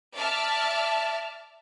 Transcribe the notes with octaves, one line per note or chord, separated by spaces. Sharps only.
D5 E5 A5 D6 F6